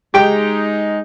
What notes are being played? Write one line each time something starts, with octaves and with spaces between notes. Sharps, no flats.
G#3 D#4 G4 G5